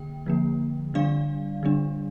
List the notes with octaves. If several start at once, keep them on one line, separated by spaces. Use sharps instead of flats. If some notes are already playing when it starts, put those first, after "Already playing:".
Already playing: D3 A#3 G5
D3 F3 A#3
D3 G3 D4 D5 F5
D3 G3 D4